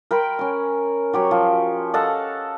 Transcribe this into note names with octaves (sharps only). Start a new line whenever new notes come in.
A#4 G5 B5 C6
C#4 G#5
F#3 G4 C#5
F3
A4 D#5 F5 F#5